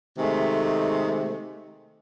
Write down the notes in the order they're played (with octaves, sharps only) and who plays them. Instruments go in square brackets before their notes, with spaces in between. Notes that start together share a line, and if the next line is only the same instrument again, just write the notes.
[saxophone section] C3 D#3 G#3 A3